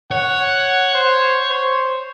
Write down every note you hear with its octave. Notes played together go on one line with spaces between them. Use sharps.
C#5 F#5
C5
C5